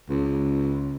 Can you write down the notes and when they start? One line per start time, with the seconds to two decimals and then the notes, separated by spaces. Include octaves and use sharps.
0.09 C#2